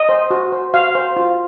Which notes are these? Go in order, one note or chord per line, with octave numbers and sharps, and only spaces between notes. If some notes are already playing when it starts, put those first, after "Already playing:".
Already playing: D#5
C5
F#4
C5
F#4 F5
C5
F4